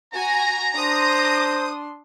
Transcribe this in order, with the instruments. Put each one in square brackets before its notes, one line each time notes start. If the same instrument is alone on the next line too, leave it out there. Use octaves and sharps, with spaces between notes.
[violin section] F#4 G#5 [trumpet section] A#5
[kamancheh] D4 C6 [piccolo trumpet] C5 [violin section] D#6